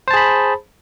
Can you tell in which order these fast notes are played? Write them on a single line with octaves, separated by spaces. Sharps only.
C5 A5 G#4 B5